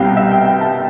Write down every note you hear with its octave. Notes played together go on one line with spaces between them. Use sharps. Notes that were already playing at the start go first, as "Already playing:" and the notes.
Already playing: C2 B2 G3 C4 F5 G5
E5
G5
G5
A5